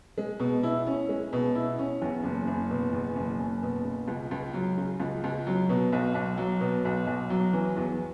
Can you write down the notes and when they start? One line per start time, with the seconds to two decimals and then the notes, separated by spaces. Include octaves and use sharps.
0.18 G#3
0.40 B2
0.63 E4
0.87 C#4
1.09 G#3
1.33 B2
1.55 E4
1.79 C#4
2.02 E2
2.24 F#1
2.47 F#1
2.71 B2
2.93 E2
3.16 F#1
3.39 F#1
3.63 B2
3.85 C#3
4.08 C#2
4.31 C#2
4.54 F#3
4.78 C#3
5.00 C#2
5.24 C#2
5.47 F#3
5.69 B2
5.92 B1
6.15 B1
6.38 F#3
6.61 B2
6.85 B1
7.07 B1
7.30 F#3
7.53 E3
7.77 E2